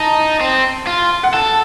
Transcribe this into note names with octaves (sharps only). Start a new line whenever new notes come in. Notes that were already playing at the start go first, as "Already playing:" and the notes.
Already playing: D#4 A5
C4
F4
F#5
A4 A5